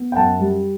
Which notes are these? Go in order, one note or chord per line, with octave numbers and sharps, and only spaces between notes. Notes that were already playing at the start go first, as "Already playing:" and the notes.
Already playing: B3
G5
F#2 F#5 A5
G3